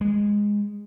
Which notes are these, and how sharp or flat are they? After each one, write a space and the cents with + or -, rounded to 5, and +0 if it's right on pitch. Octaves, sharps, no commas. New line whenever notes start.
G#3 -10